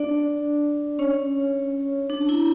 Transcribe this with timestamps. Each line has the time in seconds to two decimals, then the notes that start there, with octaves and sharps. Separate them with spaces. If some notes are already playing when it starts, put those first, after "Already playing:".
Already playing: D4 D5
0.99 C#4 C#5
2.10 D4
2.29 E4